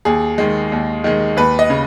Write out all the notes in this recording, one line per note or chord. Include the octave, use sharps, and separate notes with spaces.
D#2 G#4
D#3 G#3
D#2
D#3 G#3
D#2 B4
D#5
C#3